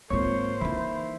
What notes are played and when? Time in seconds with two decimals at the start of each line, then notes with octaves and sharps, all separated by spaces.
0.10 G#1 A#3 F4 C5 C#5
0.61 E3 D#4 E4